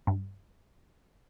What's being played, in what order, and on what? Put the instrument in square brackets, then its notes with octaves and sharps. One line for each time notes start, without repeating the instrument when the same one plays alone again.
[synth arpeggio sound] G2